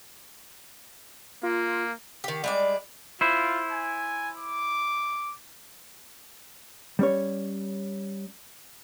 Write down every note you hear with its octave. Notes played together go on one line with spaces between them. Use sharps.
A#3 F4
D#3 G4
G3 G#3 D5
E4 F4 C5
G#5
D6
G3 C#4 C#5